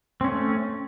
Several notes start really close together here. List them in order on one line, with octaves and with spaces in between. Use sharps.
C4 C#4 A3